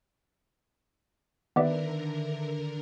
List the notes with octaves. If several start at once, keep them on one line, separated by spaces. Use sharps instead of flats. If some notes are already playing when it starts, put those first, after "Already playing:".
D3 D#3 B3 G4 A#4 B4 D5 E5